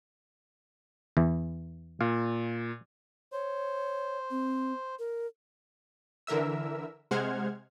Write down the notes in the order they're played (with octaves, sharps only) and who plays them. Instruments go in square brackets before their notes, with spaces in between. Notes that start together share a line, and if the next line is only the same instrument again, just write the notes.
[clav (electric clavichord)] E2 E3
[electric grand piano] A#2 [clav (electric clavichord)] F5
[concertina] C5 [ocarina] C#5
[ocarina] C4
A#4
[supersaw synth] D3 E3 A#4 E5 E6
C3 G#3 C5 F#5 F6 G#6